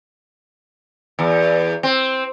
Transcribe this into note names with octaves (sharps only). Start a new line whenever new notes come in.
E2
C4